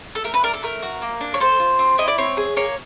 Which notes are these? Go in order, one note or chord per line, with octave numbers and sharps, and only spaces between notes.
A4
A3 A#4
B4
D4 A#4
A4
A3 A#4
F#4
A#3
D4
C#5
A4 C5
F4
C4
E4 D#5
D5
C4 C#5
G#4
A#3 C#5